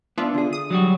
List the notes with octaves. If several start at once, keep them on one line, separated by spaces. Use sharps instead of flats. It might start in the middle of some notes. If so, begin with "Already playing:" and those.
B3 D4 F4 E5
D3 G#4
D#6
F#3 G3 F#4